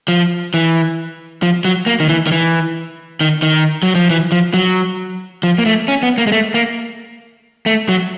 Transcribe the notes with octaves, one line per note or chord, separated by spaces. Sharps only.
F3
E3
F3
F#3
A#3
D#3
E3
D#3
E3
D#3
D#3
F#3
F3
E3
F3
F#3
F3
A#3
A3
C#4
B3
A#3
G#3
A3
A#3
A3
F#3